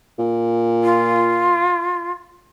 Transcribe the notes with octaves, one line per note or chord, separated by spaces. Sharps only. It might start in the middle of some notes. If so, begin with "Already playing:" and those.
A#2
F4